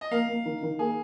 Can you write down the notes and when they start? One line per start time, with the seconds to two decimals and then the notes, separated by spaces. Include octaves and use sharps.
0.01 D#5
0.11 A#3 F5
0.29 A#3
0.45 D#3
0.63 D#3
0.79 A#3 G#4